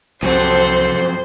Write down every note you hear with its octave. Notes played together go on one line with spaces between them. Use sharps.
C2 F2 F#3 C4 A4 C5